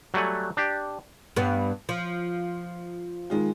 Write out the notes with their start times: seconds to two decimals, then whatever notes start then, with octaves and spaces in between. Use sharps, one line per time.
0.14 F#3 G3 A3 F#5 G#5
0.57 D4 G4
1.36 G2 B3
1.89 F3
3.30 D#3 G#3 F4